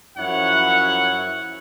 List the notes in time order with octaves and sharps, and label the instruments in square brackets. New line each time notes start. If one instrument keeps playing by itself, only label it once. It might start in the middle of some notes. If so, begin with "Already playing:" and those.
[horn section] F#2 F3 E4 C#5 F#5